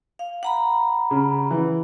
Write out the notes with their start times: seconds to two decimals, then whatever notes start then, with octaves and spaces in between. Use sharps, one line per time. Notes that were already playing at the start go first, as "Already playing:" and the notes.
0.19 F5
0.43 F#5 A#5 B5
1.11 C#3
1.51 E3